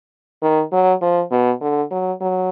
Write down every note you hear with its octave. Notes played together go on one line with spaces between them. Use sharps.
D#3
F#3
F3
B2
D3
F#3
F#3